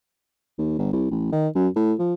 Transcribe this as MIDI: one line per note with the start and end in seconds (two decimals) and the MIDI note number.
0.58 0.74 39
0.78 0.92 31
0.93 1.07 36
1.11 1.30 33
1.32 1.48 51
1.55 1.68 42
1.76 1.93 45
1.99 2.14 53